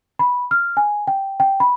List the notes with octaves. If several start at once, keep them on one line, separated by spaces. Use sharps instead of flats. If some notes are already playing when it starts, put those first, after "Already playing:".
B5
F6
G#5
G5
G5
B5